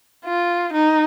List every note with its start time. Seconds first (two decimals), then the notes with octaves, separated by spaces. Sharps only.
0.25 F4
0.74 D#4